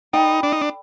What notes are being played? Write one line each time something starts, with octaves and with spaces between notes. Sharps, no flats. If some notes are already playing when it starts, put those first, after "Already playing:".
D#4 A4 D5 G5 B5
D4
D#4
D4